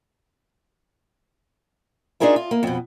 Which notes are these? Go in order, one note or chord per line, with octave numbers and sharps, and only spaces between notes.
D4 D#4 F4 G#4 A#4 E5
F4
A#3
F2 B2